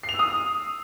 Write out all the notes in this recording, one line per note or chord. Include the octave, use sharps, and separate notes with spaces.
C7
F7
E6
D#6